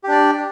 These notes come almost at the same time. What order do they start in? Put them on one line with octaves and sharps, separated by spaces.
G4 D4 D5